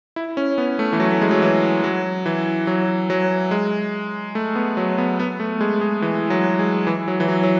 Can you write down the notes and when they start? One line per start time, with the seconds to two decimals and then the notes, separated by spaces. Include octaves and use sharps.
0.16 E4
0.37 C#4
0.58 B3
0.79 A3
0.93 E3
1.00 F#3
1.11 A3
1.21 G#3
1.31 F#3
1.42 E3
1.84 F#3
2.26 E3
2.67 F#3
3.10 F#3
3.51 G#3
4.35 A3
4.55 B3
4.77 F#3
4.98 B3
5.20 B3
5.40 A3
5.61 G#3
5.81 G#3
6.02 E3
6.30 F#3
6.59 G#3
6.87 E3
7.08 F#3
7.20 E3
7.28 F#3
7.44 F#3